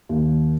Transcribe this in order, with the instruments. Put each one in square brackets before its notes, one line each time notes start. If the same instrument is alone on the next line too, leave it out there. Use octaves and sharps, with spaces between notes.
[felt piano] D#2